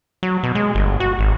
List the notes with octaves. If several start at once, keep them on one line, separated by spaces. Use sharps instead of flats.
F#3
B2
G#3
G1
F#4
G#1